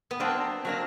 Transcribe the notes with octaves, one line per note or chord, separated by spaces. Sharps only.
B3
F#3 A#3 C4 D4
F#3 A#3 D4